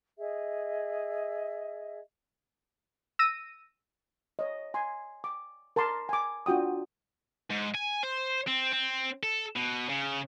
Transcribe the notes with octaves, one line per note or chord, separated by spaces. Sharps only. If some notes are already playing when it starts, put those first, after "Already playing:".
G#4 D#5 E5
E6 A#6 D#7
C#5 D#5
G#5 C6
D6
A#4 A5 A#5 C6 D6
G#5 D6
D4 F4 F#4 G5 D#6
G#2
G#5
C5
C4
C4
A4
B2
C#3